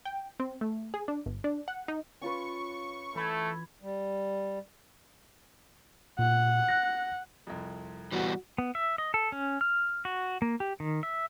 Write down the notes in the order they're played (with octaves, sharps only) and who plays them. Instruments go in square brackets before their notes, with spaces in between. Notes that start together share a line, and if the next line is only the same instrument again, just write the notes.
[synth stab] G5
C4
A3
G#4
D4
G1
D4
F#5
D#4
[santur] C#4 F4 B4 [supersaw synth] C#6
[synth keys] E3 B5 G#6 [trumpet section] A3
[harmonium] G3
[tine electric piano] A#2 [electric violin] F#5
[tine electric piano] F#6 A#6
[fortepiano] C2 F2
[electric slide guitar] E3 G3 B3 [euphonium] F#4
[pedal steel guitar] B3
E5
D#5
A4
C#4
F6
F#4
A#3
G4
D#3
E5